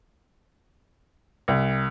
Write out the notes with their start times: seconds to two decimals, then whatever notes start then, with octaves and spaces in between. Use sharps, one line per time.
1.48 C2